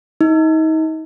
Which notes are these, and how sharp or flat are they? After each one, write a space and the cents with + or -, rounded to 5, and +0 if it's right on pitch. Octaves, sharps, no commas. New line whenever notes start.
D#4 +35